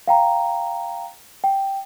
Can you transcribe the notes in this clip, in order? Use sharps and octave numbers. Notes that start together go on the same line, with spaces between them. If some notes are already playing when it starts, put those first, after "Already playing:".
F5 G5 A#5
G5